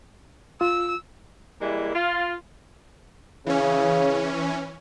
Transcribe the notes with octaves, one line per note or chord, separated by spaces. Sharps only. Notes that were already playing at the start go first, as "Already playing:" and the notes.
F4 E6
E3 G3 G#3 A#3 E4
F4
C#3 E3 C#4